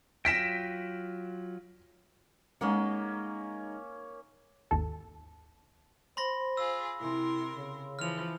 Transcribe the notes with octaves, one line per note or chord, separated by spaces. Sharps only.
F#3 F4 G5 A#6 B6 E7
G#3 A#3 C#4 D#4 F#5
G#1 D#2 A4
C5 B5 C6 A#6
F4 G#4 E6
C3 E4 A#4 C6
C#3
E3 F3 F6 F7